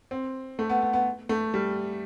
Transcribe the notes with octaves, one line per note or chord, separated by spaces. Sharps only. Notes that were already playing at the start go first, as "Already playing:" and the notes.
C4
A3
B3
B3
B3
A3
G3